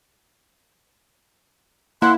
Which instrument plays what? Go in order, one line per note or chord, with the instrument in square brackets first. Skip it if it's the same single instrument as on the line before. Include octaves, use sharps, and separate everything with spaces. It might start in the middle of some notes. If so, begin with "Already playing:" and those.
[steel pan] A#3 [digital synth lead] E4 [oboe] F#5 [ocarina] C6